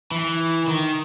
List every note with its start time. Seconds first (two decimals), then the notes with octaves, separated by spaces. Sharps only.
0.11 E3
0.68 D#3